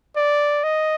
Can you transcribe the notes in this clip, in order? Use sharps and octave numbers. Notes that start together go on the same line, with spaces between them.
D5
D#5